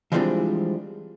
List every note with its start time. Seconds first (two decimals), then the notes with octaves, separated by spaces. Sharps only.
0.12 E3 F3 G3 G#3 C4 D4